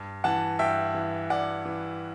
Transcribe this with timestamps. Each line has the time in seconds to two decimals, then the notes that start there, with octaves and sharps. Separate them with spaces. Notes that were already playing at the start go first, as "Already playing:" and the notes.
Already playing: G2
0.24 E3 F#5 A5
0.59 G2 E5 G5
0.95 E3
1.30 G2 D5 F#5
1.66 E3